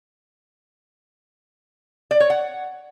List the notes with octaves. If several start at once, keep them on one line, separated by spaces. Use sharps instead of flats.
D5
C#5
F#5